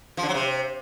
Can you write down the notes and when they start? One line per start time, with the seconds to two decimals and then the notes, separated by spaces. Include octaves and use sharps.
0.17 F3
0.23 D3
0.29 F#3
0.34 C3